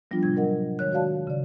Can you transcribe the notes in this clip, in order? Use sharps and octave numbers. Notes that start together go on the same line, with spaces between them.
F3 G3 B3 D4 F4
A2 C3 G3 G#6
F#3 A#4 D#5 F#5
D#3 G#3 C#5 F#6
F#4 C#5 D5 F5 A5
C#3 D5